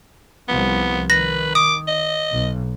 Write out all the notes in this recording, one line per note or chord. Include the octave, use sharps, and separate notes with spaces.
C2 F3 B3
D#3 B4 A#6
D6 D#6
D#5
B1